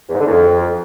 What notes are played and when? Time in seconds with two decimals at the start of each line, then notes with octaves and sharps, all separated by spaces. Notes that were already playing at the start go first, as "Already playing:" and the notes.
0.09 E2
0.15 G#2
0.20 D3
0.26 E2
0.31 F2